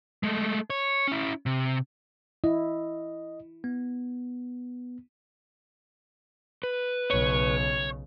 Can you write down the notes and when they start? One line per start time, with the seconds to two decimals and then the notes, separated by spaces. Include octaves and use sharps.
0.23 G#3 A3
0.70 C#5
1.08 C#4 E4
1.46 C3
2.44 E4 D#5
3.64 B3
6.63 B4
7.10 B1 C#3 C#5